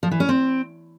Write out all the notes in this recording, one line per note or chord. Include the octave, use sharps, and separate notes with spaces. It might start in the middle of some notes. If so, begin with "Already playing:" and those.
F3
E3
C#4
C4